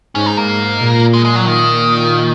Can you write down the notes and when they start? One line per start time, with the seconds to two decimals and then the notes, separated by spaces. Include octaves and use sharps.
0.15 G#2 C#4
0.26 D#4
0.37 A#3
0.81 A#2
1.14 G#3
1.25 G#3
1.36 F#3
1.46 D#3